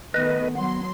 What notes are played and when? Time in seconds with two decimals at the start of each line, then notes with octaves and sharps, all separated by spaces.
0.14 D#3 A3 B3 B4 D#5
0.55 F#3 B3 C6